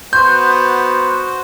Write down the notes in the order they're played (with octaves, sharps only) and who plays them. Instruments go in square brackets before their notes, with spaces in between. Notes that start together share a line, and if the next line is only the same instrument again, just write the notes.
[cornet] B3 [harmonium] F#4 C5 [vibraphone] C6 [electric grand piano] G6